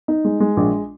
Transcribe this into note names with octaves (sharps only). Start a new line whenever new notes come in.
D#4
G#3
G#3
A#1